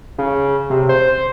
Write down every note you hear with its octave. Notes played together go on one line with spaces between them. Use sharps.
C#3
C3
C5